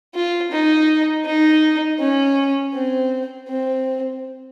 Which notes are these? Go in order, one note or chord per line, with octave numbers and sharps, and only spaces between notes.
F4
D#4
D#4
C#4
C4
C4